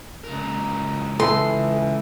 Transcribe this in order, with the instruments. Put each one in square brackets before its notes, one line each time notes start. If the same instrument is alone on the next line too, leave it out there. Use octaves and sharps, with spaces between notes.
[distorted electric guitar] C#2 A#4
[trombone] E3 [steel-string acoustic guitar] A4 [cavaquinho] C6